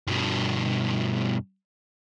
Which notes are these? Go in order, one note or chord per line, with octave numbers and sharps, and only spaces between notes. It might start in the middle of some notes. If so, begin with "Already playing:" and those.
G2 B2